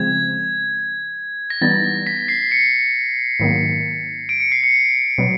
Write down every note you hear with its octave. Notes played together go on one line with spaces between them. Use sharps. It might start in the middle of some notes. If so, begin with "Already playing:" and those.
Already playing: C#3 F3 G#3 C4 G#6
A#6
E3 G3 B3 D#4 A6
A#6
B6
C7
C#7
G#2 D#3 F#3 A#3
D7
C#7
C7
C#7
B2 F#3